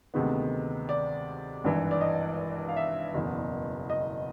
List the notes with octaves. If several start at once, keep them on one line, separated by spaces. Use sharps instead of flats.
D2 C3 D#3 G#3 B3
D5
G#1 G2 E3
D5
D#5
F5
E5
F#1 E2 B2
D#5